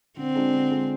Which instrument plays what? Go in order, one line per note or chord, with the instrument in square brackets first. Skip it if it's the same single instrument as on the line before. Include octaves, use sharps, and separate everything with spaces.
[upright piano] D3 [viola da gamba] C4
[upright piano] G#3 D4 F4
D3
G#3 D4 F4